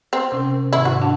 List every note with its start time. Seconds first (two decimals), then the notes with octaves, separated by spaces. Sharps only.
0.13 C4
0.32 C3 C#4 A#4
0.73 G#2 C3 D#3 E4
0.85 F#4
1.02 D4 F#5 A5